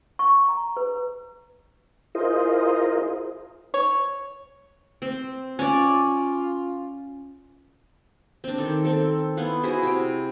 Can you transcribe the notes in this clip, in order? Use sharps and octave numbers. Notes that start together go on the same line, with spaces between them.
C#6
A#5
B4
E4 F4 G#4 A#4 C5 D#5
C#5
C4
C#4 F4 D5
C4 D4
D#3 A4
C4 A4
B3 E4 F5 F#5
E4 F#4 G#4 C5
C3 G5